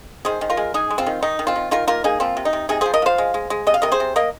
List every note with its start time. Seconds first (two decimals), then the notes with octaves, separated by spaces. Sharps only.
0.25 D#3 G#4 C5
0.41 D#3
0.50 F4 A#4
0.57 G#3
0.74 G#3 D#4 G#4
0.91 G#3
0.98 C4 F4
1.07 D#3
1.23 D#3 D#4
1.39 D#3
1.47 C4 F4
1.56 D#3
1.71 D#3 F4 A#4
1.88 A#3 F4 A#4
2.04 A#3 D#4 G#4
2.20 F3 C4 F4
2.37 C3
2.45 D#4
2.53 C3
2.69 C3 D#4 G#4
2.81 F3 G#4 C5
2.94 A#4 D#5
3.02 F3 C5 F5
3.18 G#3
3.34 G#3
3.50 G#3
3.67 C3 D#5
3.74 F5
3.82 C3 A#4 D#5
3.92 G#4 C5
4.00 C3
4.16 A#3 A#4 D#5